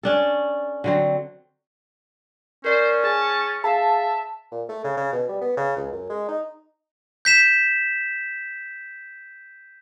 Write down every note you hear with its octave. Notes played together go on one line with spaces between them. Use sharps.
C#4 D4 A4
D3 F#3 C4
C#4 A#4 C5 D5 A6
G#4 G#5 A5
G#4 E5 F5 A5 C7
A#2
A3
C#3
C#3
B2
G3
B3
C#3
C#2
F#2
G#3
D#4
G6 B6 E7